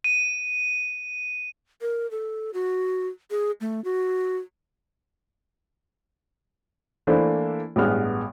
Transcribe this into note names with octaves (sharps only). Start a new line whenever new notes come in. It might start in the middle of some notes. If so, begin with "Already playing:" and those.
D#7
A#4
A4
F#4
G#4
A3
F#4
E3 A3 A#3 D4 E4 C5
A1 G2 G#3 B3 F6